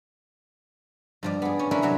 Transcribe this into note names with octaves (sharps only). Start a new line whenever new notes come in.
G2 F3 D5
B3 G#4
C#4
C#4 D4 E4 A#4 B4
C3 F#3 E5